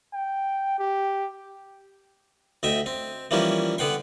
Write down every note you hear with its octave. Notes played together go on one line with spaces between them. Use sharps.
G5
G4
D2 D#5 E5 G5
C4
E3 F3 G3 A#3 C#4 E4
D3 B3 F#5 G5 C6